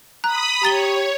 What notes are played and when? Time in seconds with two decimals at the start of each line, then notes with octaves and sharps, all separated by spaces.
0.24 A#5 B5 D#6 F#6
0.63 G4 C#5 A#5 A6 G7